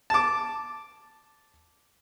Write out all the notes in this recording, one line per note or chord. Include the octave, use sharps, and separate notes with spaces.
A5 D6